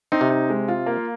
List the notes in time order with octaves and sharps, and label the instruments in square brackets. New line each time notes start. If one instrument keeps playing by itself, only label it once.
[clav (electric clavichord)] C4 [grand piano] D#4
[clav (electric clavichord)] C3
[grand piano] D#4
G#3
F4
A#3